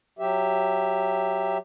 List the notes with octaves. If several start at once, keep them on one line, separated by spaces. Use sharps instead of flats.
F#3 G4 E5